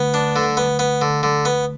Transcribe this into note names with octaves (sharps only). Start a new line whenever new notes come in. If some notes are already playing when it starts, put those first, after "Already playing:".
Already playing: D2 B3
D4
D3
B3
B3
D3
D3
B3